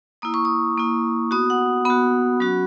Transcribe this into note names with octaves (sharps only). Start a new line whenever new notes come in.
A#3 E4 D#6
C#6
D#6
A#3 E4
B3 F#4 D#6
F#5
B3 F#4 B5
F#3 C#4 F#4